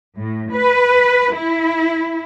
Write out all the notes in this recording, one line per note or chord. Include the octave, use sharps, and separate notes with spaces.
A2
B4
E4